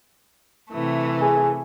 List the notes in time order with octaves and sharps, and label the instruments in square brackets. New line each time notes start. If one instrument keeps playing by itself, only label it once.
[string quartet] C3 E3 A3
[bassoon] G#4